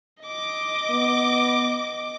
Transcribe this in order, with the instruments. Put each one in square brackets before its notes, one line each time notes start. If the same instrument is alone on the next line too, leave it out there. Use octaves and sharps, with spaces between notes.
[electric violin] D#5 D6
[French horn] B3